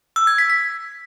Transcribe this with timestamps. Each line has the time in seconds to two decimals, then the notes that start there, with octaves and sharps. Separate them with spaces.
0.16 E6
0.27 G#6
0.38 B6
0.50 B6